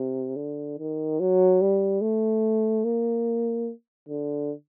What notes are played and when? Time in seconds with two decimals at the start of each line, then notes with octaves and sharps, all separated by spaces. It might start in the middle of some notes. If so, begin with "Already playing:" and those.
Already playing: C3
0.36 D3
0.78 D#3
1.20 F#3
1.61 G3
2.02 A3
2.85 A#3
4.09 D3